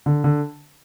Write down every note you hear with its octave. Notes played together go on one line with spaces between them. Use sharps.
D3
D3